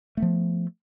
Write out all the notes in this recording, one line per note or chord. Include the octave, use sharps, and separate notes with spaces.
F3 A3 B3